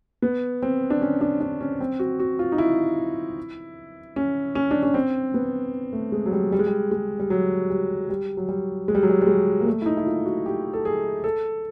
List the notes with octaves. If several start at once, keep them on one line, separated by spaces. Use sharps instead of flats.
B3
C4
D4
C#4
D4
D4
C#4
C4
F#4
F#4
F4
D#4
E4
C#4
C#4
D4
C#4
C4
B3
A3
G#3
F#3
G3
G3
G#3
G3
G#3
G3
F#3
G3
G3
F#3
G3
G#3
G3
F#3
G3
G3
G#3
A#3
A3
E4
D#4
E4
F4
F#4
G4
A4
G#4
A4